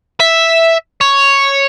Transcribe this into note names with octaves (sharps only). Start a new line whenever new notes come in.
E5
C#5